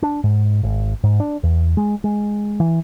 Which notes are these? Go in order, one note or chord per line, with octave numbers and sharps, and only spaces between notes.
D4
G#2
G#1
G#2
D4
E2
G#3
G#3
E3